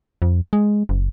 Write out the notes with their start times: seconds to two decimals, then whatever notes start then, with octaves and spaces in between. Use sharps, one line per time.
0.22 F2
0.53 G#3
0.89 F#1